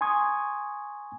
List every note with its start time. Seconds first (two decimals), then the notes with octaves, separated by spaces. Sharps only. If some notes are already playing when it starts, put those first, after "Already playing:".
0.01 G#5 C6 C#6 D#6 G#6